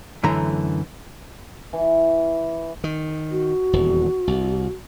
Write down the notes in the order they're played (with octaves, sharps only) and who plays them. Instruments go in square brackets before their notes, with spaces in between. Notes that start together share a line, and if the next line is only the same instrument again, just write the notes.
[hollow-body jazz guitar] F#2 D3 E3 A3 A#5
[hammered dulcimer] E3
[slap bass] D#3
[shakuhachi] F#4
[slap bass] D#1 E2
C2